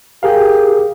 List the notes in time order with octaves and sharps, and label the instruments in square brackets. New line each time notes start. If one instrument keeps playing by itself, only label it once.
[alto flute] G4 [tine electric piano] G#4 A#4 F5